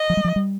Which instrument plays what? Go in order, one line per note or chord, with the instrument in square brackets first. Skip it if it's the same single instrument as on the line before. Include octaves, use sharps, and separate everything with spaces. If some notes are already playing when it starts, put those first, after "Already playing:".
Already playing: [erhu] D#5
[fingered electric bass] F3
G3
F3
G3